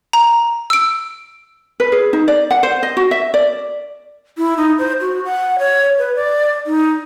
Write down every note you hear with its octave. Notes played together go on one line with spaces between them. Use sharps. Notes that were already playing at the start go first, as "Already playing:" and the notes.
A#5
E6 D7
B4
G#4
D#4
D5
F#5
C5
D#5
F#4
E5
D5
E4
D#4
C5
F#4
F#5
C#5
B4
D5
D#4